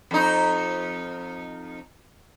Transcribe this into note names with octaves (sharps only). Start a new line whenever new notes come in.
F2 D#4